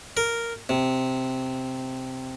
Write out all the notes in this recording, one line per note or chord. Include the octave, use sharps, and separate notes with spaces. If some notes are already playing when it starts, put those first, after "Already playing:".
A#4
C3